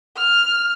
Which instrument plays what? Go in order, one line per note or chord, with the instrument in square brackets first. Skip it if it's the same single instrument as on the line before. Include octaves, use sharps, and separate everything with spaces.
[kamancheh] F6